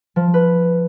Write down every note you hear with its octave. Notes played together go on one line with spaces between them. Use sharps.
F3
B4